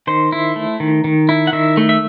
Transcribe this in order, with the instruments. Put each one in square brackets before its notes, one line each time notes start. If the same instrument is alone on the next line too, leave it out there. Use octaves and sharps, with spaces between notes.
[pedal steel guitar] D#3 C5
E4
A3
D#3
D#3
E4
F#5
D#3 E5
A3
E5